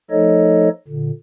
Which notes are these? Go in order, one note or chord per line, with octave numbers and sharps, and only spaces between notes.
F3 A3 D#4 A4 C#5 D#5
A#2 D3